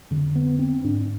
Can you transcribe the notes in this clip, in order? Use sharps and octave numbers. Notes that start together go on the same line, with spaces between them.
F2 D3
B3
C4
G#2 D4